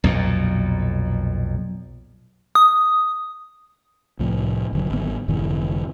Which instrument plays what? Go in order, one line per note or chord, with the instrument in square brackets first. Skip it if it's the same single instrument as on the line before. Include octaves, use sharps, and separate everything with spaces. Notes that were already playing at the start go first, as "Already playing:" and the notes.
[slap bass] B1 F2 A#2
[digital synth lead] D#6
[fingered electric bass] C2 A2 F3
F1 D3 F#3
G#1 B3
F1 G#2 D3 E3